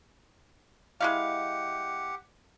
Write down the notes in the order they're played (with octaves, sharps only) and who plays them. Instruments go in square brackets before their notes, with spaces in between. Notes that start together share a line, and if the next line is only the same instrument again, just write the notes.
[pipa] G#3 E4 F5 [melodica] G4 F#5